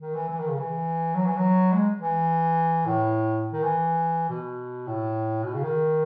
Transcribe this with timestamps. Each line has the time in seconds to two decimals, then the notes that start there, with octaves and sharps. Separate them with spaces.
0.01 D#3
0.15 E3
0.29 E3
0.39 D#3
0.48 C#3
0.58 E3
1.15 F#3
1.26 E3
1.37 F#3
1.73 G#3
2.01 E3
2.86 A2
3.53 D#3
3.63 E3
4.30 B2
4.87 A2
5.44 B2
5.54 C#3
5.63 D#3